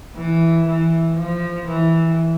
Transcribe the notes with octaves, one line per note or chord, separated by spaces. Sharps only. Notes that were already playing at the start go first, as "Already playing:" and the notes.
E3
E3
F3
E3